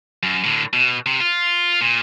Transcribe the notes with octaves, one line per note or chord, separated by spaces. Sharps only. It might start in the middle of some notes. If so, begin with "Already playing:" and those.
F#2
A2 D3
B2
C3
F4
A#2